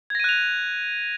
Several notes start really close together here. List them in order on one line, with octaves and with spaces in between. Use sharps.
G#6 A#6 D#7 F#6 F7